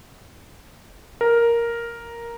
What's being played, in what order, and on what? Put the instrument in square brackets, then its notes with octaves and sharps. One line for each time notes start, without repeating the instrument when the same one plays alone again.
[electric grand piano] A#4